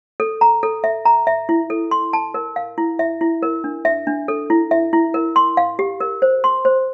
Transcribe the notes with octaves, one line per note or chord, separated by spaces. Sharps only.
A4
A#5
A4
E5
A#5
E5
E4
A4
C6
A5
A#4
F5
E4
E5
E4
A#4
D4
E5
D4
A4
E4
E5
E4
A#4
C6
F5
G4
A#4
C5
C6
C5